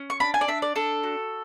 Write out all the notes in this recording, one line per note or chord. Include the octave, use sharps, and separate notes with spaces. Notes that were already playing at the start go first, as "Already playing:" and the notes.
Already playing: C#4
C#6
D4 B5
G#5
D5
D4 E5
D5
D4 A4
F#4